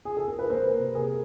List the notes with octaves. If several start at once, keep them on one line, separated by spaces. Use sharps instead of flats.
G#4
A4
A#4
B4
A#3 A#4 C5
C3
G#4 A#4